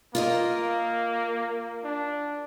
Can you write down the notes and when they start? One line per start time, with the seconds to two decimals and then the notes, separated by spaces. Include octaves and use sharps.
0.15 A#3 F4 A#4 D#5
1.84 D4